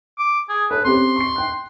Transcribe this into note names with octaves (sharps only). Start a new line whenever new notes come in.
D6
G#4
A4 B4 C#5
C4 C#4 G4 C6
C#6 C7
G5 F#6